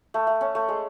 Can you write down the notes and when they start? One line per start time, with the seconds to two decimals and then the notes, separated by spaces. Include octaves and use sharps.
0.14 A3
0.27 A3
0.41 C#4
0.55 A3
0.68 G#3